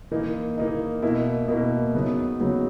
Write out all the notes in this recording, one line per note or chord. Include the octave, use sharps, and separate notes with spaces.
E3 A#3 D#4
E3 A#3 D#4
B2 A#3 E4
B2 A#3 E4
C#3 F#3 B3 D#4
C#3 F#3 B3 D#4